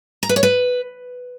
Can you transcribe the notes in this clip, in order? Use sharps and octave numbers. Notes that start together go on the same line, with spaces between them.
A#5
B4
C#5
B4